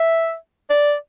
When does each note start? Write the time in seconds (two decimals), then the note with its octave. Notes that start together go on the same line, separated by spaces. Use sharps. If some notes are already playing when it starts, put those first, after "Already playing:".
Already playing: E5
0.70 D5